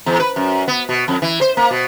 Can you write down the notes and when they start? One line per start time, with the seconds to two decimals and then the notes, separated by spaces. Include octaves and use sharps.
0.06 E2
0.20 B4
0.36 F#2
0.68 B3
0.89 B2
1.08 F2
1.22 E3
1.41 C5
1.57 A#3
1.71 B2